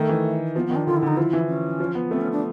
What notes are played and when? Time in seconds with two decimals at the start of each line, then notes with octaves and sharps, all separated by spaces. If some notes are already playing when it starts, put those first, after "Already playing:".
Already playing: D#3 A3
0.09 E3
0.56 F3 B3
0.66 B3
0.70 D#3
0.75 D4
0.87 D3 F4
0.97 E4
1.03 D3 D#4
1.17 F3 E4
1.33 E3
1.48 C#4
1.80 F3
1.95 B3
2.11 A3 C4
2.21 C#4
2.32 D4